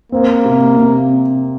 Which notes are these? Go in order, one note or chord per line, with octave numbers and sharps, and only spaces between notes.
A#3 C4
C3
C3